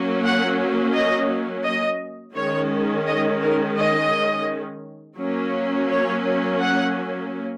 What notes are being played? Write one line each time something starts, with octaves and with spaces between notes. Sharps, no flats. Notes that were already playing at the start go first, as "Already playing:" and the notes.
Already playing: F#3 A#3 C#4
F#5
D#5
D#5
D#3 G#3 C#4 C#5
D#5
A#4
D#5
F#3 A#3 C#4
C#5
F#5